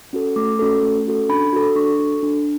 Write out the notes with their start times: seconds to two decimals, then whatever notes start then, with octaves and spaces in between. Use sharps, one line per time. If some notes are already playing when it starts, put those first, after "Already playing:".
0.13 C#4 F#4 A4
0.36 A3 D6
0.59 C#4 F#4 A4
0.82 A3
1.06 C#4 F#4 A4
1.29 D4 B5
1.53 F#4 A4
1.76 D4 C#6
1.99 F#4 A4
2.23 D4